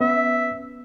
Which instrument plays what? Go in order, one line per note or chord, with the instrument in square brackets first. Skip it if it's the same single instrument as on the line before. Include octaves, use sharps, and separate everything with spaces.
[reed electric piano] B3 C#4 [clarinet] E5